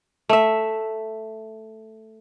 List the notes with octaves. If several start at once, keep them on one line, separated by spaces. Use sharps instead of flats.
A3 E5